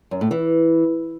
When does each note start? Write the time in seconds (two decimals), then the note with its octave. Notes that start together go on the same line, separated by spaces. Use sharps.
0.11 F#2
0.21 A2
0.31 E3